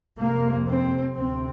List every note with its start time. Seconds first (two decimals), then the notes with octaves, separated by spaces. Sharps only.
0.18 F2 C3 A#3
0.67 C4
1.15 D2 C3 C4